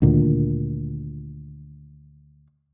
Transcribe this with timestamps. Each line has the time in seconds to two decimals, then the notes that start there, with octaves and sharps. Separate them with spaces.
0.02 D2 A#2 D#3